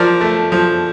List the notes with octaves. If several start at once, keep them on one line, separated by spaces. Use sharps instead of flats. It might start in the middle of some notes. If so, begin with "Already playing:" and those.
Already playing: F3 A#4 D5
A3
F3